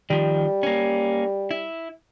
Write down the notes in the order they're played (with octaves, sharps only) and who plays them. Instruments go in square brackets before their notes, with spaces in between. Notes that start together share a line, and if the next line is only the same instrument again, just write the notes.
[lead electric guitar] D#3 F3 [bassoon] G3
[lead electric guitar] A#3 C#4
E4